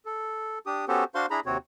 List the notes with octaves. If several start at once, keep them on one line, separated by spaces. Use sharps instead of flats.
A4
D4 G4 D#6
B3 C#4 F#4 G4 A4 C5
D4 F#4 C5 F5 C6
D4 E4 G#4 A#5 B5
D#2 C3 C4 F#4 C#5